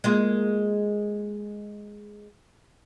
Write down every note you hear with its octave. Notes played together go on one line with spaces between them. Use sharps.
G#3 A#3 F4